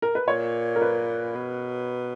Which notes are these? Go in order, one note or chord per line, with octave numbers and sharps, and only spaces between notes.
A#4
B4
A#2 C#5
A#4
B4
B2